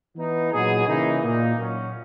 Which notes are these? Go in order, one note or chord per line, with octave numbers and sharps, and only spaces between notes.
E3 B3 D#4
A#2 F#3 B3 D#4 G#4
C#3 E3 A#3 D#4
A#2 A#3 D#4
A#2 F#3 C#4